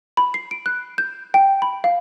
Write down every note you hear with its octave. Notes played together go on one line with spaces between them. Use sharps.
B5
C7
D7
F#6
G6
G5
B5
F5